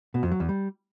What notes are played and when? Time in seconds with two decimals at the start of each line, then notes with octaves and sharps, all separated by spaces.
0.14 B2
0.23 F2
0.31 F#3
0.40 E2
0.49 G3